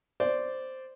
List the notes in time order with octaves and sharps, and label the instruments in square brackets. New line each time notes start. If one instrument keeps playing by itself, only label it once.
[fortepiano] C5 D5